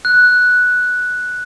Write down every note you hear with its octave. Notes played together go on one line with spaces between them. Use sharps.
F#6